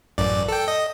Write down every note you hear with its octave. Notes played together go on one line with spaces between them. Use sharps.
A1 F#2 D5
A4 G5
D#5